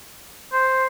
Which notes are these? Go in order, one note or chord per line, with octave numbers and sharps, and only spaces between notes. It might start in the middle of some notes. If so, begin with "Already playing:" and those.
C5